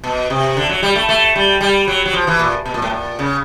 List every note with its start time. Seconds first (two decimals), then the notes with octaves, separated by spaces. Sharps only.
0.04 B2
0.30 C3
0.57 D3
0.69 F#3
0.83 G3
0.96 A3
1.09 A3
1.36 G3
1.61 G3
1.88 F#3
2.06 F#3
2.13 F3
2.27 E3
2.39 A#2
2.66 B2
2.74 A#2
2.82 A2
2.90 A#2
3.19 C#3